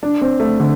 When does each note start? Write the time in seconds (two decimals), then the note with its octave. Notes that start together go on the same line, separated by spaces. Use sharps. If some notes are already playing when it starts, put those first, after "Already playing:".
0.03 D4
0.21 C4
0.40 A3
0.60 D3